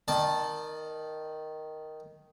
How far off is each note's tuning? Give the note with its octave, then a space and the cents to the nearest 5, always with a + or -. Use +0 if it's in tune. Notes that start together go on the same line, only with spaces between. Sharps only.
D#3 +0 D5 +35 A5 -10